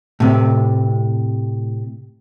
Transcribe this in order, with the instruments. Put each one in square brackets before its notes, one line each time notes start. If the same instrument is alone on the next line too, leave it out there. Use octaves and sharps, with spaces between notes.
[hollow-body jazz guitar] A2 C3